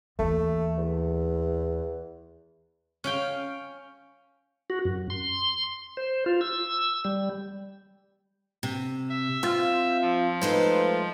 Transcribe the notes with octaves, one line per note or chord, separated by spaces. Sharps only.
D#2 E3 A3
E2
C#4 F5 G5
F#4
F#2
C6
C5
F4
E6
G3
C3
E5
C4 F4
F3
G#3 A3 D#4 F4 B4 C5